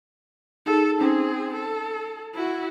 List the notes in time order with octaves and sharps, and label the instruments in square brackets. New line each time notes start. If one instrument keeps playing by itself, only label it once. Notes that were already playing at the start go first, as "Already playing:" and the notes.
[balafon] D#4 G#4 [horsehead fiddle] A4
[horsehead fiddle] C4 G#4 [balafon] C#4 D#4
[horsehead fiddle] A4
E4 F#4